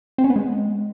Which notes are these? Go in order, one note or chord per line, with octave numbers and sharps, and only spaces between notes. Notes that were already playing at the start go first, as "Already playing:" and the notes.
C4
C#4
B3
G#3